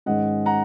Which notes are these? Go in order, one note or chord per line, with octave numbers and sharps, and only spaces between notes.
G#2 D#3 G#3 C#4 D#5 F#5
F#5 A#5